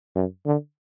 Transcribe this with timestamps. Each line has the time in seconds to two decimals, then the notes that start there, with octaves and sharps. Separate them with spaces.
0.16 F#2
0.46 D3